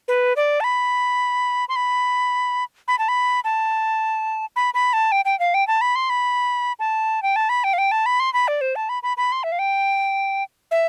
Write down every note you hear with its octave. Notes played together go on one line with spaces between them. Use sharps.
B4
D5
A5
B5
C6
B5
B5
A5
B5
A5
B5
B5
A5
G5
G5
F5
G5
A5
B5
C6
B5
A5
G5
A5
B5
G5
F5
G5
A5
B5
C6
B5
D5
C5
A5
B5
B5
B5
C6
E5
F5
G5
E5